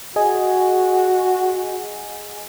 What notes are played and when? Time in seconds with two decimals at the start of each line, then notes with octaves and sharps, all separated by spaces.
0.16 F#4 G#4 D#5 G#5